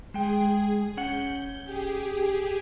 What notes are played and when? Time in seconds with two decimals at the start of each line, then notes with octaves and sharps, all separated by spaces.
0.14 G#3 G#4 G5
0.97 C#4 F#5 G6
1.64 G4 G#4